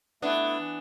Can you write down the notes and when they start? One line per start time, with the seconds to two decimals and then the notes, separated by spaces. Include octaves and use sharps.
0.22 A3 B3 D4 E4
0.59 E3